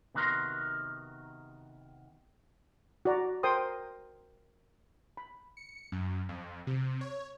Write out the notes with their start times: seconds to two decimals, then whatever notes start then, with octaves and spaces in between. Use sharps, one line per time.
0.14 C3 D#3 B3 F#4 A#4 C6
3.05 F#4 D5 A#5
3.43 A#4 C5 G5 C6 D#6
5.17 B5
5.57 C#7
5.92 F#2
6.29 F2
6.67 C3
7.01 C#5